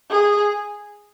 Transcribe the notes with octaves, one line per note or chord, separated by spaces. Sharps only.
G#4